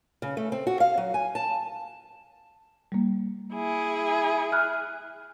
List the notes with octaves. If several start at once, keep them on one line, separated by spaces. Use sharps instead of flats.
C#3
A3
C4
F#4
F5
F#3
G#5
A5
G3 A#3
E4 G#4
E5 F6 F#6